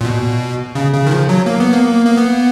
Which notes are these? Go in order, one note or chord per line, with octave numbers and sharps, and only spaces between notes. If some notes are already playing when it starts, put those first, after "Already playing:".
A#2
B2
C#3
C#3
D#3
F3
F#3
A#3
B3
A#3
A#3
B3